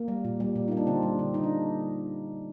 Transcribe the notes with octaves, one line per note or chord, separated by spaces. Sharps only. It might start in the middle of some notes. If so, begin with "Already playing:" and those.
Already playing: A#3
G3
A#2
G3
A#2
A#3 D#4
D4
D3 C4
G3
D3
D3 D#4
D4